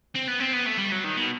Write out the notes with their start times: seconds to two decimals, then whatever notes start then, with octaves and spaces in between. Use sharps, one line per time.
0.15 C4
0.28 B3
0.40 C4
0.53 B3
0.66 A3
0.78 G3
0.92 F#3
1.04 D#3
1.17 B2